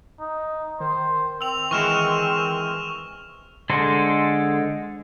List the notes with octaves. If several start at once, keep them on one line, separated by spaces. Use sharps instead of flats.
D#4
D#3 C5
C4 E6 F7
E3 G#3 F#4 C#6 F6 E7
D3 G#3 A4 C5